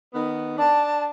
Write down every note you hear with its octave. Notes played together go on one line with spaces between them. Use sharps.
D#3 B3
D4 A5